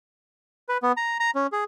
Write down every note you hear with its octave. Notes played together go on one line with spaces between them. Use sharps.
B4
B3
A#5
A#5
C#4
G#4